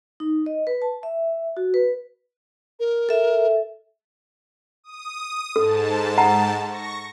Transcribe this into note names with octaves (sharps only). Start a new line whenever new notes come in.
D#4
D#5
B4
A5
E5
F#4
B4
A#4
A4 E5
D#6
G#2 A4 A5
F#5 A#5
C#6 A#6